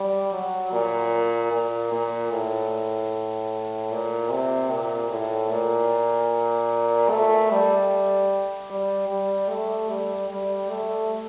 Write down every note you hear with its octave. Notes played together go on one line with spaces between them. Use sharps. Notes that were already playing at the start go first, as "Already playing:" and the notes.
Already playing: G3
F#3
A#2
A#2
A#2
A2
A#2
C3
A#2
A2
A#2
A3
G3
G3
G3
A3
G3
G3
A3